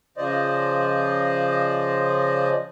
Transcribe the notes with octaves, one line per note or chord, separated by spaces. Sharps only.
C#3 F3 C5 D5 D#5